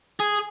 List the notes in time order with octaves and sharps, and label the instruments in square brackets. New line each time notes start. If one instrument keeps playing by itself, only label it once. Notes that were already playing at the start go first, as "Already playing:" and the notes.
[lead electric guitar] G#4